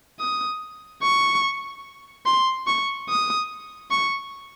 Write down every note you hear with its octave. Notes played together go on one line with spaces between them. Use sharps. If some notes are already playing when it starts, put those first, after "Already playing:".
D#6
C#6
C6
C#6
D#6
C#6